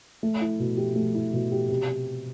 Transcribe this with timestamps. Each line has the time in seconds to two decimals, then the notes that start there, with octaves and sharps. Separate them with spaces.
0.23 A3
0.41 E4
0.60 B2
0.77 G4
0.96 A3
1.14 E4
1.33 B2
1.52 G4
1.69 C3